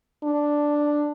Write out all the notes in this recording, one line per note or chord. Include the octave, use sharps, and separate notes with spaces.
D4